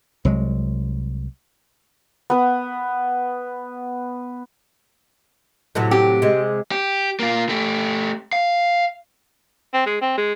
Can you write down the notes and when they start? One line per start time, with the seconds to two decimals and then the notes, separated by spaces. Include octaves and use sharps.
0.25 C2 F#3 G#3
2.30 B3 B4
5.75 A2 C3 F#3
5.91 G4
6.22 C3 G#3
6.71 G4
7.20 A#3 F4
7.49 A3 G4
8.33 F5
9.74 C4
9.86 G#3
10.01 C4
10.17 G#3